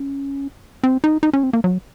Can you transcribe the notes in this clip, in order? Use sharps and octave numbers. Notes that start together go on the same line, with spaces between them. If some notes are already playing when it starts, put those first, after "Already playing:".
Already playing: C#4
C4
D#4
D#4
C#4
C4
A#3
F#3